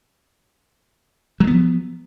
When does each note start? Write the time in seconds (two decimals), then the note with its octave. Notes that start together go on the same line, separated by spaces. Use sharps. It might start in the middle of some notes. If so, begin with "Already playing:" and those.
1.40 F#3
1.44 G#3
1.47 B3
1.51 F3